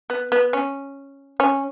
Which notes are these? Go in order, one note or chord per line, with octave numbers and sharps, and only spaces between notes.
B3
B3
C#4
C#4